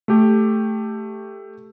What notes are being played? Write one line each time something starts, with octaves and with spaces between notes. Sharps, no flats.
A3 G4